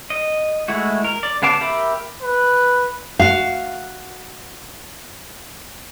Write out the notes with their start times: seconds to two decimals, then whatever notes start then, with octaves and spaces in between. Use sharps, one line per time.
0.10 D#5
0.68 G#3 A3 E4 F#4
1.04 A#4
1.23 D5
1.42 C#3 B3 F5 A5 D6
1.61 G4 A#4 E5 B5 D6
2.22 B4
3.19 F#4 F5